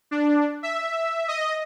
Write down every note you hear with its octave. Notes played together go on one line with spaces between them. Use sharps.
D4
E5
D#5